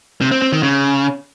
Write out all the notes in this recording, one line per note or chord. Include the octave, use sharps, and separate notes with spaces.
C3
C4
C4
D#3
C#3